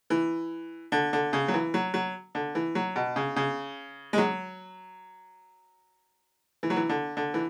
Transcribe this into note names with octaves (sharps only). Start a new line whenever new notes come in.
E3
D3
D3
C#3
F#3
E3
F#3
F#3
D3
E3
F#3
B2
C#3
C#3
G#3
F#3
E3
F#3
E3
D3
D3
E3